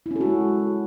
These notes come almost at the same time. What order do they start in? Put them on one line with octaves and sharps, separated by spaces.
E4 C#4 A4 F#4 G#3